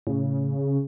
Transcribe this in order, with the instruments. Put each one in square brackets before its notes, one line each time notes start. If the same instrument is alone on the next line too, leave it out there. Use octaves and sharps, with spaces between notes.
[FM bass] A2 [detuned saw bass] C#3